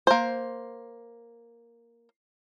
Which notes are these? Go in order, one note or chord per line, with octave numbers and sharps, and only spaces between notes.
A#3 C5